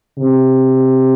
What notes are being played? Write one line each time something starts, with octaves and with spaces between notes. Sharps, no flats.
C3